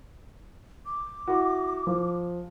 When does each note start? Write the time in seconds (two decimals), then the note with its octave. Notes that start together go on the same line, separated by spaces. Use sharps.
0.86 D6
1.28 E4 F#4
1.87 F3